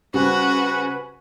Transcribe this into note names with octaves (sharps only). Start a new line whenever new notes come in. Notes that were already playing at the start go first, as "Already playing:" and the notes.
C#3 G3 C4 F#4 B4 G#5